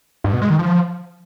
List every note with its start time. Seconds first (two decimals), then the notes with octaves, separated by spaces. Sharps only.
0.24 G2
0.33 B2
0.42 G#3
0.50 D#3
0.59 F3